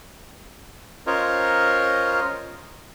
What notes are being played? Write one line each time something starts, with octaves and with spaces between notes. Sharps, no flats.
C#4 F4 A#4 C5 C#5 D#5